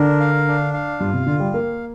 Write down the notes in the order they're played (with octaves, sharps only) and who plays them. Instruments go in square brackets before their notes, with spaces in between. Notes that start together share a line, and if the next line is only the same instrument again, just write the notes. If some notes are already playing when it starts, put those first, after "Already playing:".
Already playing: [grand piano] D3 [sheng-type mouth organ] D4 A#4
[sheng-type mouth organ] F5
D4
F5
[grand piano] G2 [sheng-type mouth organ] F4
[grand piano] C3
[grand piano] D3 [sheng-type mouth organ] F4
[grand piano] G3
[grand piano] A#3 [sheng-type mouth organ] F5